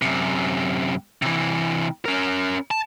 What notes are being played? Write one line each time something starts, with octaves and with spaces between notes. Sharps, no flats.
F#2 C3
C3 E3
C#4 A#4
A5